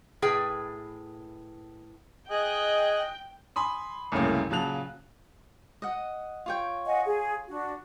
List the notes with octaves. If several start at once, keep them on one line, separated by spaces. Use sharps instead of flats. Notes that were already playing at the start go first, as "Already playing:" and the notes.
A2 G#4 B4 G5
G#4 D#5 G5 F#6
G#5 B5 C6 D#6
C2 F#2 A2 C#3 A3 A#3
A#2 C#3 F#3 A5 F#6 F7
D#5 F#5
F4 C#5 G5
D#5 F#5 G#5
G#4
D4 F#4